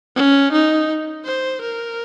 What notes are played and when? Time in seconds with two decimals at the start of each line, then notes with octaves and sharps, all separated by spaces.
0.16 C#4
0.52 D#4
1.25 C5
1.62 A#4